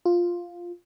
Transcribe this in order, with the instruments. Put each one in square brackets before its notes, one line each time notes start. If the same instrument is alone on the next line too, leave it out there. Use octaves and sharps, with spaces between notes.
[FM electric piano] F4